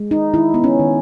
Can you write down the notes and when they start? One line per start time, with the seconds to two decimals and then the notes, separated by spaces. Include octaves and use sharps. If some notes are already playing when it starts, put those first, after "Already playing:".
Already playing: G#3
0.11 D#4
0.34 D#3 E4
0.54 B3
0.64 C#4
0.79 D#3